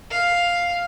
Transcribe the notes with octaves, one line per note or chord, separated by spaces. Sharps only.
F5